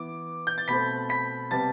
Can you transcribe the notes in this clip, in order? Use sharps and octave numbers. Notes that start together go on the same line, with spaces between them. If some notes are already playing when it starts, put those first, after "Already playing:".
Already playing: E3 B3 D6
G6
A6
B2 A3 C4 B5 B6
B5 B6
C3 G3 B3 A5 A6